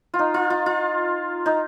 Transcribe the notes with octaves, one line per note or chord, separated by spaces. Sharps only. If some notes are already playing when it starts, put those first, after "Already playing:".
F4
D#4
F4
F4
F4
D#4